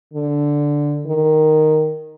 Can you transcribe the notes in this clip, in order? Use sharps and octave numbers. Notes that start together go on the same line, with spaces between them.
D3
D#3